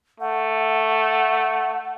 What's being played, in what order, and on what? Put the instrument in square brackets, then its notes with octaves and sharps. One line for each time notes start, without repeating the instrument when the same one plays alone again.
[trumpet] A3 [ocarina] F#5